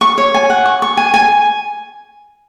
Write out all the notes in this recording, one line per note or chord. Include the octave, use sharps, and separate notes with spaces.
C#6
C#5
G#5
F#5
C#6
C#6
G#5
G#5